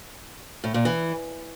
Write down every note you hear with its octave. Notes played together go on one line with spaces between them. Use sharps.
A2
A#2
E3